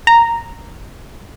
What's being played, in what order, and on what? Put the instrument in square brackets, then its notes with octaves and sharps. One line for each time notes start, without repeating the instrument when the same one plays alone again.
[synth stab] A#5